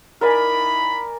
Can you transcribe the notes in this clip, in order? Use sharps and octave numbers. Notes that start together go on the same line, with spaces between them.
D#4 E4 A#4 D5 G#5 B5